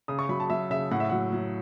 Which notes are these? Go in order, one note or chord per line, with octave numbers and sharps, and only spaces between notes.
C#3 D#6
C#6
F#3 B5
A5
F#3 E5
C#3 E5
A2 F#5
E5
F#3 F#5
F#3